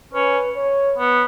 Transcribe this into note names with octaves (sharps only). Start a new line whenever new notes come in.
C#4 B4
C#5
B3